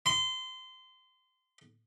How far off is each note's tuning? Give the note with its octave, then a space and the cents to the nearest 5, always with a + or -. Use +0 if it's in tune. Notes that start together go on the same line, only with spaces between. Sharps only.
C6 -25